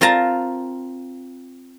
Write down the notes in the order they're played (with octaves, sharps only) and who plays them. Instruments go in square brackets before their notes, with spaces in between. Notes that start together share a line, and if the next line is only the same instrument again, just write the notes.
[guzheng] C4 F4 A#4 A5 A#5